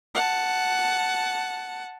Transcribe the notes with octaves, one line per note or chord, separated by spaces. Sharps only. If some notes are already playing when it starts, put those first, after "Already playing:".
F#5 A5